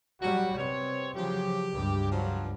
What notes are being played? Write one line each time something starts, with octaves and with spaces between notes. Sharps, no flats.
F#3 G3 F#4
C3 B3 C4 C#5
C#3 F3 F#3 G4
C#2 G2
F3 F#3